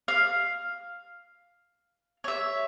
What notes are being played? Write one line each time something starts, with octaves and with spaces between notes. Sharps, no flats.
F5
C#5 E5